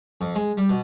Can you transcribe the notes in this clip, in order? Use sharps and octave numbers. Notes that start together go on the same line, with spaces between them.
F2
G#3
G3
B2